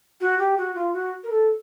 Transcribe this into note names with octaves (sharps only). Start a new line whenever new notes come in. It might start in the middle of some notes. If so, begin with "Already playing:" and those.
F#4
G4
F#4
F4
F#4
A#4
A4